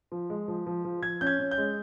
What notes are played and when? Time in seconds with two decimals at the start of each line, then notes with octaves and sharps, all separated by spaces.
0.12 F3
0.30 G#3
0.48 F3
0.67 F3
0.85 F3
1.02 F3 G#6
1.21 C#4 G6
1.27 G#6
1.39 C#4
1.51 G6
1.58 G#3